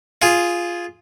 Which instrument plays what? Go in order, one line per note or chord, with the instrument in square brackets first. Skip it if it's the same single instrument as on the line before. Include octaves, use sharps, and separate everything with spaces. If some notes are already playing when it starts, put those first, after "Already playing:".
[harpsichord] F4 G#4